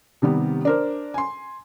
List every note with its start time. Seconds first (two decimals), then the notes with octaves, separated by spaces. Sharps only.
0.22 C3 D#3 G3 B3
0.65 D4 A#4 C5
1.14 G#5 C6